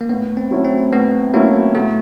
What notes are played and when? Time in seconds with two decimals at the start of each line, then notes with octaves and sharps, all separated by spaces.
0.01 A#3
0.09 A2 B3
0.37 C4
0.51 F#3 A3 C#4 E4
0.64 C4
0.92 A2 B3
1.33 F#3 A3 A#3 C#4 E4
1.75 B2 A3